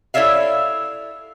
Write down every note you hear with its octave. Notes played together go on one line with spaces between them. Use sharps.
E4 A4 C#5 D5 E5 F5